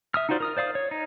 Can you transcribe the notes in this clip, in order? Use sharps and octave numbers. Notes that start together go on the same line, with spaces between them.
E5 D#6 F6
D#4 F4 F#4 C5 D5
A#4 D#6 F6
C5 D5 F5 D#6
C#5
D#4